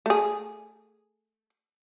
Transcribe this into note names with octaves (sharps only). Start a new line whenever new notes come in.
A3 G#4